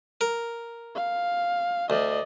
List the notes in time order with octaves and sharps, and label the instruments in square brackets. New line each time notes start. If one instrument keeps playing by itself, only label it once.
[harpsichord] A#4
[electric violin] F5
[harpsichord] D2 [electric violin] D5 D#5